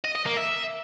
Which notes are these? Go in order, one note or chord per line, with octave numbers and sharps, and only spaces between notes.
D#5
D#5
A#3
E5